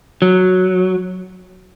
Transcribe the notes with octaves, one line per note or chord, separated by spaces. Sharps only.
F#3